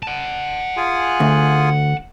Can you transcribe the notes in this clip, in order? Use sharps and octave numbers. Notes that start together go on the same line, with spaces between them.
F#5 A5
F4 G#4 G#5
D2